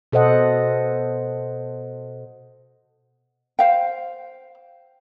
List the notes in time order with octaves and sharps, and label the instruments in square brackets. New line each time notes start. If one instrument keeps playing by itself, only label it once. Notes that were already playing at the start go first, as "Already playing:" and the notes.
[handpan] B2 A4 C5 D#5 F#5
[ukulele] C5 F5 G5